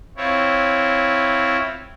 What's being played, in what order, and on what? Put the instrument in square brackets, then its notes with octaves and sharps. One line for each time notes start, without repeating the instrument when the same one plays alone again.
[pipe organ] C4 E4 F4 C#5